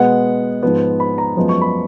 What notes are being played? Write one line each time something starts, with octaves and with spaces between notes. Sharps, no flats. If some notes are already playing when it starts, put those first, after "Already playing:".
Already playing: B2 G#3 B3 F#5
G#2 F3 B3
B5
A#5
F#2 F3 G#3 B3
C#6
B5